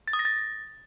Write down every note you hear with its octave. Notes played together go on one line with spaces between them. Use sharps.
A6
D#6
A#6
A6